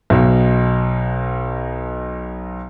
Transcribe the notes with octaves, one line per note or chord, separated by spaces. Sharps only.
B1 B2